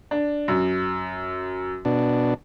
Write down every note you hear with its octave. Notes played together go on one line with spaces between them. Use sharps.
D4
F#2
B2 D4